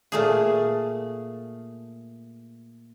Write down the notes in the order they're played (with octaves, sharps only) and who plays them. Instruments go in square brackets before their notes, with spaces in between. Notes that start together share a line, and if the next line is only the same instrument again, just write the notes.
[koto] A#2 A3 G#4